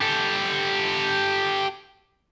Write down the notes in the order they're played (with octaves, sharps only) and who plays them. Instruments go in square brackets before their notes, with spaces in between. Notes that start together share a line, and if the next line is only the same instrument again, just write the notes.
[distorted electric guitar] G4 A4